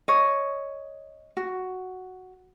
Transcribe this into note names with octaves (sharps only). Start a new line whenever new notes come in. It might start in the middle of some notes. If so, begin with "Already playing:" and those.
C#5 D#5
F#4